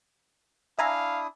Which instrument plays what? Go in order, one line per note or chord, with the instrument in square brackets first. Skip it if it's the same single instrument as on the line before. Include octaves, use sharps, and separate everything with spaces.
[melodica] D4 E4 D#6 [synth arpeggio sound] E5 G#5 A#5 [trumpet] F5